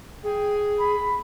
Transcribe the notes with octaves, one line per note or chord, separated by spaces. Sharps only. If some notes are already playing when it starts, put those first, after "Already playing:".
G#4 G5
B5